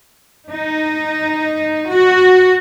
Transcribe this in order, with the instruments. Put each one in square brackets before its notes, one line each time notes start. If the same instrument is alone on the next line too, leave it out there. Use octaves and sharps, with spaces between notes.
[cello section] D#4
F#4